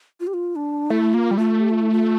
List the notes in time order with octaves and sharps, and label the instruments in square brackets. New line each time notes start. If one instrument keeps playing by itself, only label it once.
[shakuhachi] F4
G4
F4
D4
[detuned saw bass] A3 [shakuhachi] E4
[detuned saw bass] A#3 [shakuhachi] F4
[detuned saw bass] G3
[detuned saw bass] A3 [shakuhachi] F4
[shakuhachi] G4
F4
E4
F4